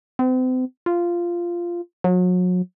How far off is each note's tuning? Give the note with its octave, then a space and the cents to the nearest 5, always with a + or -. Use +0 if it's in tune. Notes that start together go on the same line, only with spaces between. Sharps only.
C4 -40
F4 -10
F#3 -35